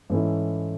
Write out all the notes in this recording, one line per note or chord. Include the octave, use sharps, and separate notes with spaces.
G#2 E3 A3 C#4 E4